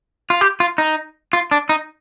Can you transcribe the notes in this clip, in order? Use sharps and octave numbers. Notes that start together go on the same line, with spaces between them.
F4
G4
F4
D#4
F4
D4
D#4